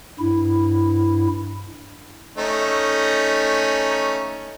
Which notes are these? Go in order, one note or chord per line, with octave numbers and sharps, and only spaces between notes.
G2 E4
A3 C#4 D#4